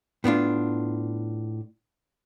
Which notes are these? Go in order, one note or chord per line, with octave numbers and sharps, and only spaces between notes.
A2 B3 D4 F4